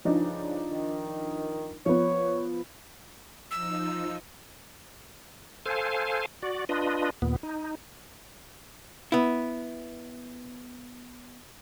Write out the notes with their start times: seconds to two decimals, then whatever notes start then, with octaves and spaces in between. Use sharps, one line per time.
0.05 G2 C#3 F3 D4 D#4
0.72 D#3
1.86 F3 B3 C#5
3.51 F3 D#4 E6
5.66 A4 C5 F5 G#5
6.42 F#4 D5
6.69 D4 F4 B4 D#5
7.22 D#2 A#2 B3
7.43 D#4
9.12 B3 E4